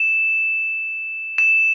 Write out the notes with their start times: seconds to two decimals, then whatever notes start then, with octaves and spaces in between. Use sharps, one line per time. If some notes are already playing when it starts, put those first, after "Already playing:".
Already playing: E7
1.38 E7